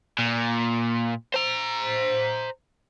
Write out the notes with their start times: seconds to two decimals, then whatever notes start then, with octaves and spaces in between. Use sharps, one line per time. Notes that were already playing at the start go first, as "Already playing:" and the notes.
0.19 A#2
1.34 C5 A#5